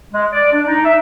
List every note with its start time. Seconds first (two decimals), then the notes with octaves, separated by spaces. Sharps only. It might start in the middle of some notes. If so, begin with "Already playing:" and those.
0.11 G#3
0.32 D5
0.51 D4
0.66 D#4
0.84 E5